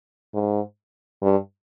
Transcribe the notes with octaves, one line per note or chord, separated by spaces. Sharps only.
G#2
G2